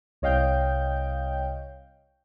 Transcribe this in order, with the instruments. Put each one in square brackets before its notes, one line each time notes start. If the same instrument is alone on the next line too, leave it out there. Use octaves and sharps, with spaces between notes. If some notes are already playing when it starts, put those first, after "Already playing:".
[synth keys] C2 C#5 D#5 F5 G5 G6